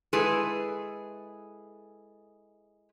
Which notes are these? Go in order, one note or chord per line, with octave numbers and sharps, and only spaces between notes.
G#3 E4 G#4 A4 B4